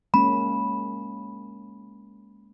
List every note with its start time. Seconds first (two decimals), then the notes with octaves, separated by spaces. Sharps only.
0.14 G#3 A#3 C#4 B5